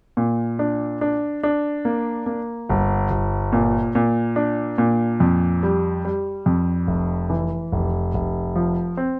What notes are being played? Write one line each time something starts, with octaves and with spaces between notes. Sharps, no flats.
A#2
D4
D4
D4
A#3
A#3
G1
G1
A#2
A#2
D4
A#2
F2
G3
G3
F2
F1
E3
F1
F1
F3
C4